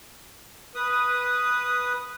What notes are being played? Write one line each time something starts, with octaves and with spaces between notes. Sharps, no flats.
B4 D#6